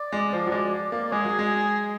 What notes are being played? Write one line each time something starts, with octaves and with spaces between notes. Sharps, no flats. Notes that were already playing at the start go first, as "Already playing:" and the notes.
Already playing: D5
G#3
F3
F#3
G#3
A#3
G#3 G#4
F#3
G#3